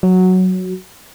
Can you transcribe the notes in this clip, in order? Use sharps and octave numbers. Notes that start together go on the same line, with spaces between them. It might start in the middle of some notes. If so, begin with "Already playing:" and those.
F#3